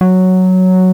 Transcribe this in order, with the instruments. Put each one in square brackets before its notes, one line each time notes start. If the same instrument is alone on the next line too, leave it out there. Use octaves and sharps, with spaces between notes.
[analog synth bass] F#3